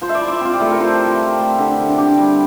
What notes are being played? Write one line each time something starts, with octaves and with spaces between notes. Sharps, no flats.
F3 C5
E5
D5
E4
D5
C4 F4
G4
A3 A4
A#4
F3 C5
E4
G4
C4
A3
D3 G4
D3
D4 G4
G3